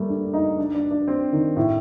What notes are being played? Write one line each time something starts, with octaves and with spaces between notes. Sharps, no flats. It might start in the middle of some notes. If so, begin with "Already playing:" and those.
Already playing: G3 A3 A#3
D4
D#4
D4
D4
D4
C4
D#3
A2